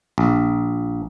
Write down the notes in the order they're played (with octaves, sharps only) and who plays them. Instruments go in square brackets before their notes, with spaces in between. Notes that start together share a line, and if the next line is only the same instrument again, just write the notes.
[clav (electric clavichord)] A#1